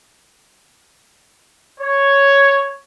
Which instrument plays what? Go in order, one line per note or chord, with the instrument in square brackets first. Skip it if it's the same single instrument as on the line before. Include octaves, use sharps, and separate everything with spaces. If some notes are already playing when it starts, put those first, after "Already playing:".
[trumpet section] C#5